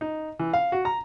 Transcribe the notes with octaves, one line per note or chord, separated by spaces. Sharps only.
D#4
E3
F5
F#4
A#5